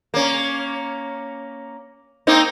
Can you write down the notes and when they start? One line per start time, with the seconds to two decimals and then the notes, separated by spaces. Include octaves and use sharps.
0.14 A#3 C#4
2.27 A#3 C4 D#4